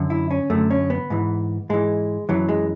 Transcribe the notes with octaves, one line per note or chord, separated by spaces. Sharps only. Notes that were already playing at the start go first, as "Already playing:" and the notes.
Already playing: F#2 D3
E4
C#4
F#2 D3 A3
C#4
B3
G#2 E3
G#2 E3 G#3
F#2 E3 F#3
G#3